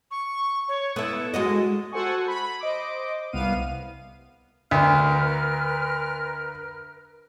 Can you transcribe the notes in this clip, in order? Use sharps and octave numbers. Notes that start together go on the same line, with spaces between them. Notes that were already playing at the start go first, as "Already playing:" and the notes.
C#6
C#5
B3 E4 A4
G#3 F#4 D#5
F#4 A4 C5 F#5 G#5 C#6
B5
C5 D#5 D6
C2 B3 F5 D#7
D2 A#4 B4 F6